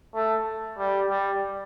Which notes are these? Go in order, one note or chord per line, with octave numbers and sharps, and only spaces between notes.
A3
G3
G3